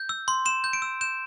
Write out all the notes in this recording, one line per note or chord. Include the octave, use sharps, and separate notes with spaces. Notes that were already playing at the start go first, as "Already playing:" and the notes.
Already playing: G6
E6
C6
C6 E7
G6
D7
E6
G6 E7